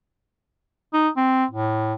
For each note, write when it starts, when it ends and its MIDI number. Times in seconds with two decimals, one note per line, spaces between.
0.93 1.09 63
1.17 1.45 60
1.51 1.94 45